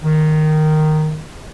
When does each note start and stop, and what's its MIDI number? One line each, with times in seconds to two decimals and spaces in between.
0.03 1.20 51